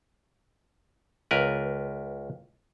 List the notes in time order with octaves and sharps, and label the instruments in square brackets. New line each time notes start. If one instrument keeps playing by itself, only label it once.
[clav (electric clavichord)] C#2 A#4 B4